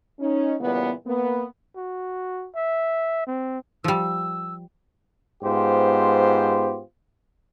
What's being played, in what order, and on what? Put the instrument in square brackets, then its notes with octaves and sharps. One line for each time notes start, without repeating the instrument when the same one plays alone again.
[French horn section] C#4 D#4
A#2 C#3 E3 G3 B3
A#3 B3
[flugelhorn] F#4
E5
C4
[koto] F3 G3 [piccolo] E6
[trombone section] G#2 B3 F4 G4 C5